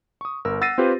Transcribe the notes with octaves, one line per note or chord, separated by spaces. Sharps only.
C#6 D#6
G1 A#4 E6
F#5 E6 A6 A#6 C7 D#7
C4 F4 G4 B4 C5